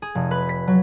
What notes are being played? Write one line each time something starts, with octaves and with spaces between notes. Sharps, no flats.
G#4
F1
B4
B6
F#3